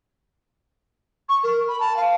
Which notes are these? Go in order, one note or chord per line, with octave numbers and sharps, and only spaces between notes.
C#6
A#4
B5
A5
F5